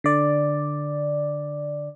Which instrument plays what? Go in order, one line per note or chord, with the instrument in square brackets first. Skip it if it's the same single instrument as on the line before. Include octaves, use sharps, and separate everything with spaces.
[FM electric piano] D3 D5